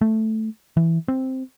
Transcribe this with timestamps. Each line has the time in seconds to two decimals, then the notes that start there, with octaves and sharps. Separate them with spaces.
0.01 A3
0.77 E3
1.08 C4